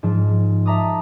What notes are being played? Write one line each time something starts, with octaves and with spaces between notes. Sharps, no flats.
G#2 F3
E5 A5 A#5 D6 D#6